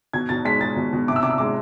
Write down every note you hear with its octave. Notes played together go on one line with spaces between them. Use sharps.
B2 G#6
B2 A6
G#3 B6
G#3 A6
B2
B2
C3 D6
E6
C3 D6
E6
G#3 D6